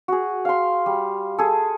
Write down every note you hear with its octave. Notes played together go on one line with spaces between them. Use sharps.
F#4 G#4
F5 C6
G3
G#4 A4